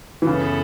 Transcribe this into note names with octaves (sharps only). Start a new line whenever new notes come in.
E3
F#2 C#3 F#3 B3 E4 A4